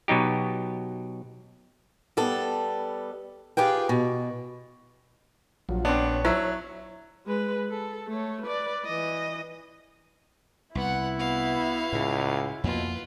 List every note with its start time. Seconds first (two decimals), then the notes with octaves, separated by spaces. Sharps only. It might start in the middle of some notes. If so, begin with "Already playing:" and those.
0.08 B2 F#3 D#4 G4
2.17 G3 B3 A4
3.57 F4 G4 G#4 B4 G5
3.89 B2
5.69 A#1 F3 F#3
5.85 B3 C4 D4 C#5
6.25 F#3 E4
7.26 G#3 B4
7.70 A4
8.07 A3 C#5
8.42 B4 D5
8.85 E3 D#5
10.75 C2 B3 E4 F#5
11.18 B3 F#4 F5
11.93 C#2 A2 C#3
12.64 F2 B2 A#3 F4 B4